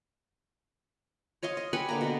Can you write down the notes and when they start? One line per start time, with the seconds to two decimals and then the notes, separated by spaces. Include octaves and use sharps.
1.43 C#5 D#5 F5 C6
1.57 D#5
1.73 G4 B4 F#5 G#5
1.89 D3 A#3 A#5
2.01 B2 B3